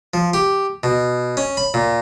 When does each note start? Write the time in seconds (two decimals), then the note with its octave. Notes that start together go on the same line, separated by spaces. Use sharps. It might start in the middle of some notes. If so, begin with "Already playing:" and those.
0.14 F3
0.34 G4
0.83 B2
1.37 C#4
1.57 B5
1.74 A#2